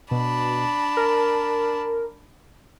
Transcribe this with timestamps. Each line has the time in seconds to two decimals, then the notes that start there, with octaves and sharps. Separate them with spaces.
0.11 B2 D4 A5 B5
0.97 A#4